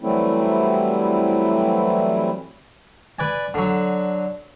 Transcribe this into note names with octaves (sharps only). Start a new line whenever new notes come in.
E3 F#3 G3 A3 C4 E4
B4 D5 G#5
D3 F#3